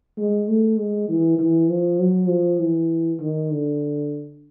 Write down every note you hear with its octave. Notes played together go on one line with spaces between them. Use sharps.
G#3
A3
G#3
E3
E3
F3
F#3
F3
E3
D#3
D3